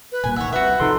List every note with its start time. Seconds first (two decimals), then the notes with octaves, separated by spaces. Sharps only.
0.12 B4
0.24 D1 A#2 G3 G#5
0.36 E1 A1 D#3 C#5 E5 F#5
0.52 C2 C3 F#4 B4 E5
0.80 G#1 C3 F3 D#4 A4 C6